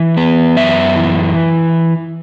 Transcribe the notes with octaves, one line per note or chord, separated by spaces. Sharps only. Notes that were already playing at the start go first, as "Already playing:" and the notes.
Already playing: E3
B3
F#2 E5
E3